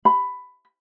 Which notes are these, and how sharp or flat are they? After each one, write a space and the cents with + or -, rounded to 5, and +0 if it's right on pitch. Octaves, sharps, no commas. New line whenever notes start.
B5 +10